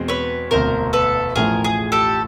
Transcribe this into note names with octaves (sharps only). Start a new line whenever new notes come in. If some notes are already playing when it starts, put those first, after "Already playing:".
Already playing: E2 B2 G#3 C4
B4 C#5
E1 D2 C3 A#4 C5
A4 B4
A1 A2 F3 A3 G#4 A#4
G#4
G4 A4